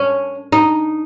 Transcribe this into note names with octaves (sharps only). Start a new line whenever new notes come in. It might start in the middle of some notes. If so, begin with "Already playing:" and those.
Already playing: C#4
D#4